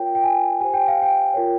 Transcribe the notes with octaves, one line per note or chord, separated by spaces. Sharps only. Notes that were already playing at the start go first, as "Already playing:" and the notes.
Already playing: F4 A#4 C#5 G5
G5
G#5
G4 C5 G#5
G5
F5
G5
F4 A#4 C#5